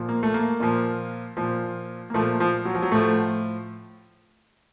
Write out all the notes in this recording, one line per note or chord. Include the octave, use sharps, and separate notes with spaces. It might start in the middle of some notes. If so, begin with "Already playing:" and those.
Already playing: A#2 F3
A#3
A3
A#3
A#2 F3
A#2 F3
A#3
A#2 F3 A3
F3
F#3
F3
F#3
A2 F3 A3